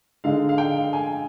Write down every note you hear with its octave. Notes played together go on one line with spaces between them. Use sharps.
D3 G#3 D#4 F5
F5
G5
G#5